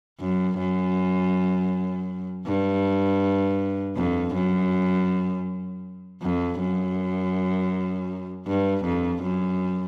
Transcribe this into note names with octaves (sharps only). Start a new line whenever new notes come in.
F#2
F#2
G2
F2
F#2
F2
F#2
G2
F2
F#2